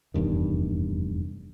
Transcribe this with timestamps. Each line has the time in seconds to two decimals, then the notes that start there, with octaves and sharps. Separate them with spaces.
0.14 F1 E2 G2 D#3